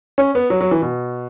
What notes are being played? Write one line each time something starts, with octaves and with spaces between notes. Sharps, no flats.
C#4
B3
F#3
F#3
E3
B2